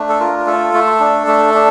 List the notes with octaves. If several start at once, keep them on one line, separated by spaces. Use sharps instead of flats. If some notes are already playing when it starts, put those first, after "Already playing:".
Already playing: A3 D4
A4
F4 A#4
A#4
A3 A4
A3
D4
A3
D4